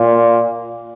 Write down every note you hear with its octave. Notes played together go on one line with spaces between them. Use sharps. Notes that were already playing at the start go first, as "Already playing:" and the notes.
Already playing: A#2